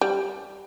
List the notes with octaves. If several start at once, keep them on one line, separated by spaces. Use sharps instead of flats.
G3